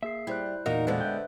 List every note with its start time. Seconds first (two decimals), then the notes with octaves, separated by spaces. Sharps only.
0.03 A#3 G#4 E5 C7
0.27 G3 E4 C5 F#6
0.66 E2 A#2 D#4 F#4 A#4 D#5 F5 F#5
0.87 D3 G#3 B3 B4 C5
1.01 E5 G5 F#6